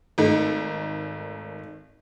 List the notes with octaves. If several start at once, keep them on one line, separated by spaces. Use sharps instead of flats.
G#1 A3 D#4